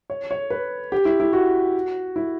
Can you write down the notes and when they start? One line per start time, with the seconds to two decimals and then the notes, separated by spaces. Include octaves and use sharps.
0.10 C#5
0.31 C#5
0.50 B4
0.92 G4
1.05 E4
1.20 E4
1.33 F#4
2.16 E4